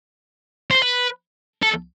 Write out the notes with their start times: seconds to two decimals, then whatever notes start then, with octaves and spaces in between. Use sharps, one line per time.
0.71 C5
0.82 B4
1.62 A4